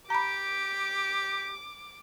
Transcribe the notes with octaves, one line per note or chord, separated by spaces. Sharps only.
G4 A#5 B5 D6